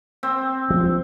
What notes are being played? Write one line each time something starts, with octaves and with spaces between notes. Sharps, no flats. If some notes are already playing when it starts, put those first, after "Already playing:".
C4
F3